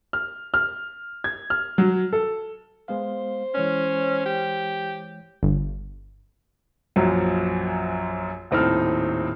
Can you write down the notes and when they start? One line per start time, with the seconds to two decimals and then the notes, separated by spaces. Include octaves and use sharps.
0.13 F6
0.54 F6
1.24 G#6
1.50 F6
1.78 F#3
2.13 A4
2.88 G#3 B3 C5 F5
3.55 E3 G#3 C#4 C#5
4.26 G4
5.43 G1
6.96 A#1 F#2 F3 F#3
8.51 D#1 A2 C4 D#4 A4 F6